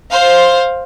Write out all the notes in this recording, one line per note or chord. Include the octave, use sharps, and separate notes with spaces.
C5 F5